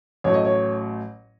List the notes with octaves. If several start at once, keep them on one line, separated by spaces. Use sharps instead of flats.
A1 A2 F#3 A3 C#5
D#5
C#5